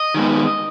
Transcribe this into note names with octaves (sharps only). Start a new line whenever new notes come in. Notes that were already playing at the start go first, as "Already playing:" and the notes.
Already playing: D#5
D#3 G#3 B3